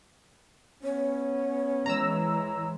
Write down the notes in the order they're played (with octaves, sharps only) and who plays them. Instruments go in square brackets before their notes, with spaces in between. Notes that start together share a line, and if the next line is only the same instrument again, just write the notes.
[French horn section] B3 C#4 [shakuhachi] C#5
[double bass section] E3 G#3 [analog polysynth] A#5 E6